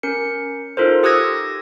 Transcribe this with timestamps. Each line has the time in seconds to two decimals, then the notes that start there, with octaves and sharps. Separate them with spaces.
0.03 C#4 A#4 C#7
0.77 D#4 F4 A4 A#4 C5
1.03 G4 D#6 E6 F#6 G#6 A#6